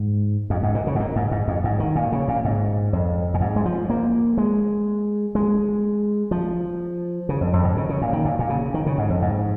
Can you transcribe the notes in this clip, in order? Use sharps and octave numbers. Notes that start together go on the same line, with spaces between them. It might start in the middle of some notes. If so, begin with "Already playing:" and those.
Already playing: G#2
F2
G#2
A#2
C#3
G#2
A#2
G#2
G#2
F2
G#2
D#3
A#2
C#3
A#2
G#2
F2
A#2
G#2
G#3
F3
A#3
G#3
G#3
F3
C#3
F2
F2
G#2
C#3
C#3
A#2
D#3
A#2
A#2
C#3
D#3
C#3
G#2
F2
G#2